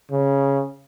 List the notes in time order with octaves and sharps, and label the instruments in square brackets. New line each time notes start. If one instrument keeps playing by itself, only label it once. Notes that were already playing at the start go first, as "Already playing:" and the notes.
[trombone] C#3